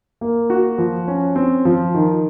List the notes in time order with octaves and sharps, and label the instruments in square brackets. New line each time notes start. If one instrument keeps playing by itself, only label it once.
[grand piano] A#3
F#4
F3
C#4
C4
F3
D#3